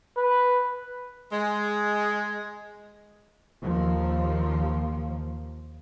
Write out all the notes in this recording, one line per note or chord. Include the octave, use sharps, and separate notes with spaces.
B4
G#3
D#2 F3 A#3